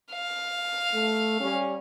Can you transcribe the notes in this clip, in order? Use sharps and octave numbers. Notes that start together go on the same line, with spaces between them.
F5
A3
G3 C#4